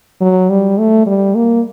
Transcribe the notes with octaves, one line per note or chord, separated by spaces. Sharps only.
F#3
G3
A3
G3
A#3